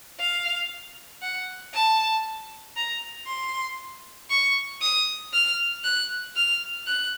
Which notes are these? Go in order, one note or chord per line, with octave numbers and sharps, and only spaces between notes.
F5
F#5
A5
A#5
C6
C#6
D#6
F6
F#6
F6
F#6